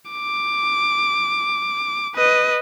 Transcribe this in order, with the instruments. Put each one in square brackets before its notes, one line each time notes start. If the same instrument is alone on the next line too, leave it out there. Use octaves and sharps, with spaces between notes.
[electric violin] D6
B4 D#5